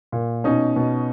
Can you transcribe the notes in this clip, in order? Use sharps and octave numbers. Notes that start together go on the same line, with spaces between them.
A#2
B2 C#4 D#4
B2